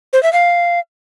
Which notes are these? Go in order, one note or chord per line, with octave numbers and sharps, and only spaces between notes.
C5
E5
F5